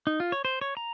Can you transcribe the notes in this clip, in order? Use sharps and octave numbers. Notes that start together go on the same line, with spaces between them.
D#4
F4
C#5
C5
C#5
A#5